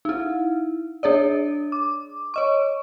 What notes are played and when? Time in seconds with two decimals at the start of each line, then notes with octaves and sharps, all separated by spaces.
0.05 D#4 E4
1.03 D4 G#4 C#5 D5
1.72 D6
2.34 C#5 D#5 C#6